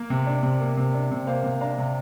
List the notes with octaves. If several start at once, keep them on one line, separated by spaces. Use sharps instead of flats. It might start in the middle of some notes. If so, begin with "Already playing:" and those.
Already playing: A#3 A#4
C3
D4
C3
A#3
C3
D4
C3
A#3 C5 F5
C3
D4 F5 A#5
C3